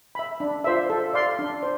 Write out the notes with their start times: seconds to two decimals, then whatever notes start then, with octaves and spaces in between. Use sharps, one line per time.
0.15 E5 B5
0.40 D4
0.64 F4 C5 E5
0.90 A4
1.14 D5 F5 C6
1.39 D4
1.63 C5